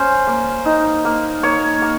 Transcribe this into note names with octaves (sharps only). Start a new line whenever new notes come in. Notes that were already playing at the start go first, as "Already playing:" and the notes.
Already playing: C#4 C5
A#3
D#4
A#3
A#3 C#5
A#3